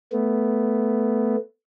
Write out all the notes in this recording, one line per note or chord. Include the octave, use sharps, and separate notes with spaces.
A3 B3